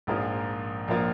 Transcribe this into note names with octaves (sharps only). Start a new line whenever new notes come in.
A#1 G#2 F3 A#3 F4
A#1 F3 A#3 F4